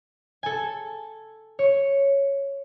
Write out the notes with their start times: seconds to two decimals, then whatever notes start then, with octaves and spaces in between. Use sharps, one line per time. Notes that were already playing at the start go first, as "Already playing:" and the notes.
0.43 A4 G#5
1.59 C#5